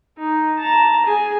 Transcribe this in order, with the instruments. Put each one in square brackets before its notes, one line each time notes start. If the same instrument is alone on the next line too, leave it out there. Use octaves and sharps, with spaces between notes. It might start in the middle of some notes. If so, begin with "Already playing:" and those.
[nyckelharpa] D#4
A5 A#5
G#4 G#5